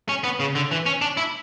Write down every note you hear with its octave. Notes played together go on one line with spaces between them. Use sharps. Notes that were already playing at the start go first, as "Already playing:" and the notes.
C#4
B3
C#3
D3
E3
C#4
D4
E4